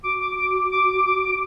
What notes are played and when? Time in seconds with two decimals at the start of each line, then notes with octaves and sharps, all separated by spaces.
0.04 F#4 D6
0.21 D6
0.37 D6
0.55 D6
0.71 D6
0.88 D6
1.05 D6
1.22 D6